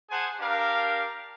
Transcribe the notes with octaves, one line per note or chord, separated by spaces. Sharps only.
G#4 C5 F#5 G#5 A5
D4 G4 A#4 F5